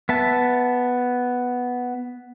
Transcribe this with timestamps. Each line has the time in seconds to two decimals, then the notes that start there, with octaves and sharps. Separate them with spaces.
0.09 B3 E5 A5